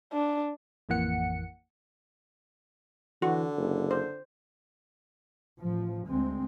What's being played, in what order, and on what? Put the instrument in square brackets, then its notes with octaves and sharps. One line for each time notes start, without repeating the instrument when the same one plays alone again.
[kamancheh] D4
[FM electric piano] A1 F2 E3 A#3 F#5 C#7
[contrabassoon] D3 [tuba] E3 [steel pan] F#4
[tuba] F#1
[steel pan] C5
[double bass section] A1 F3
D2 G#3 C4